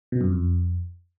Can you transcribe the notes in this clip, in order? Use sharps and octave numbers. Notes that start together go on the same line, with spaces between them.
B2
F#2
F2